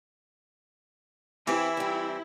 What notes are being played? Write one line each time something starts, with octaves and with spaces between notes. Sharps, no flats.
E3 C4 E4 G4
G3 C4